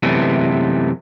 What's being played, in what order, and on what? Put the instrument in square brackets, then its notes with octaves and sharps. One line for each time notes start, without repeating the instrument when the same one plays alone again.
[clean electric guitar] F#2 C3 E3 G#3 A3 B3